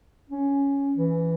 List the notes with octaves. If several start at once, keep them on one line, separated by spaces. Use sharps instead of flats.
C#4
E3